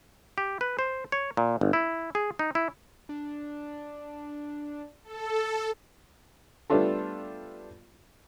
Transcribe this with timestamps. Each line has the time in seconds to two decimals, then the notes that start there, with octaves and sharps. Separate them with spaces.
0.38 G4
0.61 B4
0.79 C5
1.12 C#5
1.37 A#2
1.61 G1
1.73 E4
2.15 G#4
2.39 D#4
2.55 E4
3.09 D4
5.04 A4
6.70 G3 A3 B3 D4 F4 A4